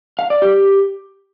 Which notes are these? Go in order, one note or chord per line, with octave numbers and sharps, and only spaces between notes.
F5
D5
G4